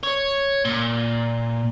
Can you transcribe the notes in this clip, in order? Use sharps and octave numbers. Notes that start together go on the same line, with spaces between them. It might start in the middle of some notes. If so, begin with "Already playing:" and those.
C#5
A#2